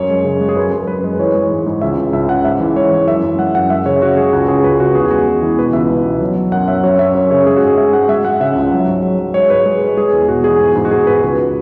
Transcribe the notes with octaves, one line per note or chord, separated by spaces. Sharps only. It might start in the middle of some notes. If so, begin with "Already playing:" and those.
Already playing: F#2 C#5
G#3
C#3
G#3
G#4
F#2 B4
F#2
F#2 B4
G#3
E3 C#5
G#3
G#2
G#2
C#2 E5
C#3
C#2 E5
C#3 F#5
G#2 E5
E3
G#3 C#5
E3
F#2 E5
F#2
G#3 F#5
F#2 F#5
G#3 E5
C#3 C#5
C#3 F#4
G#3 G#4
C#2 F#4
C#3 G#4
C#2 B4
C#3 F#4
E2 G#4
G#3 F#4
E2
E3
B2 B4
C#2 E5
C#2
B2
F#3
F#3
F#2 F#5
F#3 E5
F#2 C#5
F#2 E5
F#2 C#5
C#3 C#5
G#3 G#4
F#4
G#2
G#4
G#3 E5
G#2 F#5
G#3 E5
G#3 F#5
C#3 E5
C#2
F#3
G#2
F#3
F#3
G#3 C#5
G#2 B4
G#3 G#4
G#3
G#3 G#4
E2
B2 F#4
E2 G#4
G#2
G#2
F#4
G#2 G#4
G#2 B4
C#2